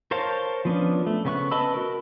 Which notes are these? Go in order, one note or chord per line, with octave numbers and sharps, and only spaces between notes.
A#4 C5 C#5 F5 A5
F3 B3 C#4 D4
A3
C#3 B3 C#6 F#6
B4 D#5 A5 B5 E6
F#4 A#4